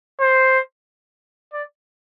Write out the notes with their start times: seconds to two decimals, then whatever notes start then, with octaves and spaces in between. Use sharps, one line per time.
0.21 C5
1.53 D5